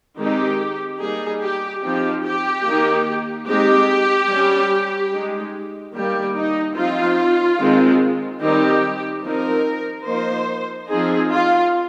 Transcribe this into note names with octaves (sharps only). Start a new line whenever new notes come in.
D#3 G#3 C4 D#4 G4
G3 A#3 D#4 G#4
G4
F3 C4 D#4 G4
G4
D#3 A#3 D#4
G#3 C4 D#4 G4
G3 C#4
G#3 D#4
D#3 G3 A#3 G4
D#4
F3 C4 D#4 F4
D#3 G#3 C4
D#3 G3 C4 D#4 G4
F3 C4 D#4 A#4
F3 A#3 D#4 C5
F3 C4 D#4 G#4
F4